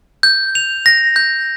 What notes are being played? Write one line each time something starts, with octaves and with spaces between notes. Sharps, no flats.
G6
F7
A#6
G6